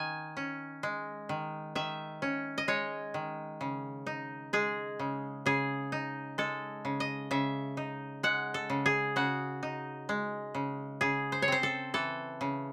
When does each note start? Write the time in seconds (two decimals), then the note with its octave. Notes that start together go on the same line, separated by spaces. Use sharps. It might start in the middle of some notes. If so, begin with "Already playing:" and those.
Already playing: D#3 G#5
0.37 C#4
0.83 G#3
1.29 D#3
1.75 D#3 E5
2.22 C#4
2.58 D#5
2.68 G#3 C#5
3.14 D#3
3.61 C#3
4.07 D#4
4.53 G#3 G#4
4.99 C#3
5.46 C#3 G#4
5.92 D#4
6.38 G#3 A4
6.85 C#3
7.00 D#5
7.31 C#3 E5
7.77 D#4
8.23 G#3 F#5
8.54 A4
8.70 C#3
8.86 G#4
9.16 C#3 F#4
9.63 D#4
10.09 G#3
10.54 C#3
11.01 C#3 G#4
11.32 C5
11.42 C#5
11.48 C4 C5
11.63 A4
11.94 E3 A4
12.41 C#3